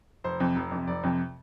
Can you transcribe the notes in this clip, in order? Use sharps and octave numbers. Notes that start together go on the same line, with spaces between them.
F1 C5
F2 C3
F1
F2 C3
F1 D5
F2 C3